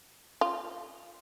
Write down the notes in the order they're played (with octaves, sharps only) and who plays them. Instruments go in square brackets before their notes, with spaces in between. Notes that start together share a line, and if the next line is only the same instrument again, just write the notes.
[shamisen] F4